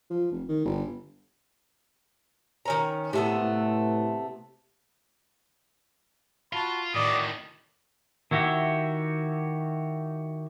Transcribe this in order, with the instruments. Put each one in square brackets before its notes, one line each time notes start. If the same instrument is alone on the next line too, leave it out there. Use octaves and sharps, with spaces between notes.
[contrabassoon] F3
F1
D#3
G1
[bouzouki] D#3 C#4 A#5
[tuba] A2 [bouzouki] C3 A3 B3
[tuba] A2
[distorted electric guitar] F4 [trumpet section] F#4 A5 B5
[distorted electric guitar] A2 D#3 [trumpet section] F#4 D5 D#6
[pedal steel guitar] D#3 E4 F#4 G4 E5